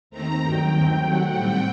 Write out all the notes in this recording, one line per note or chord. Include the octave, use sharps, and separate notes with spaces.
D#2 D#3 A3 C4 A#5
G2 D#3 F#3 G5
D#2 D#3 A3 C4
C3 F#3 A3 F#5
A2 G3 C4 G5